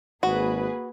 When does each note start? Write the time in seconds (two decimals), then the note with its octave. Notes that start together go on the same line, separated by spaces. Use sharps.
0.23 G#1 A#3 F#4 G#4 B4